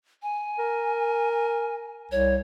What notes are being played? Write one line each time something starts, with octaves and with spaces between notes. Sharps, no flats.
G#5
A#4
C2 C#5